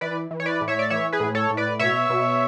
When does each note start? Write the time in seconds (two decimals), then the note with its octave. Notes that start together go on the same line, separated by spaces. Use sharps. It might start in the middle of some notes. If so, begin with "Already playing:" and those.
0.01 E3 B4 D5
0.31 E3
0.40 C#5
0.46 B4 D5
0.61 A2
0.68 C#5 E5
0.79 D5
0.90 E3 C#5 E5
1.13 G#4 B4
1.20 A2
1.35 A4 C#5
1.50 A2
1.57 B4 D5
1.79 B2 C#5 E5
2.10 B2